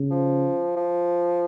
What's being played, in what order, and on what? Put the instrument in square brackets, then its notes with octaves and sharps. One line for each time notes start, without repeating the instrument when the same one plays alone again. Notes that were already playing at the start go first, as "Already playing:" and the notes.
Already playing: [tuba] C#3
[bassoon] F3
F3